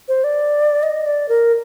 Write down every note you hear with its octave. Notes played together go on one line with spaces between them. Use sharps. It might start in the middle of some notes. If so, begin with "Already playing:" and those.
C5
D5
D#5
D5
A#4